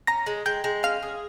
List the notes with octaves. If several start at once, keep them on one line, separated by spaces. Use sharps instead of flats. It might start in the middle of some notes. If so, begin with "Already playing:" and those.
C#4 A#5 A#6
G#3
G#3 G5 G6
G#3
C#4 F5 F6
G#4